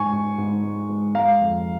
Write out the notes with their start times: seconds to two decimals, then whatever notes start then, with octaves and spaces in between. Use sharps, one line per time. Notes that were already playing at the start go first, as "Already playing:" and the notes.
Already playing: G#2 G#3 G#5 C#6
0.13 G#2
0.38 G#2
0.64 G#3
0.89 G#3
1.15 G#3 F5 A#5
1.41 F2